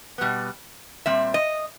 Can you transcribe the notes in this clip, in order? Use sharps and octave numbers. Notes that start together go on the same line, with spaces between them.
B2 G3 B3
A#2 G3 C4 E5
D#5